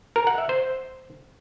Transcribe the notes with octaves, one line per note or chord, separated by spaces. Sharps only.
A#4
F#5
E5
C5